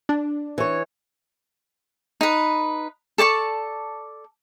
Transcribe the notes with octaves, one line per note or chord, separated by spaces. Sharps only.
D4
E3 C#5
D#4 B4
A4 D5 A5 C#6